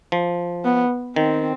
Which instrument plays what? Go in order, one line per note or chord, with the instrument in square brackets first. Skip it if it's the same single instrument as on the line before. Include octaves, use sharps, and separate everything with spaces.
[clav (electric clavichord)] F3
[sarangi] B3
[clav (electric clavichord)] D#3 [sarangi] C4